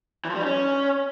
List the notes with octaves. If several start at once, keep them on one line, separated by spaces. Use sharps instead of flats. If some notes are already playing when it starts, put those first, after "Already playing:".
E3
F3
G3
D#4
C#4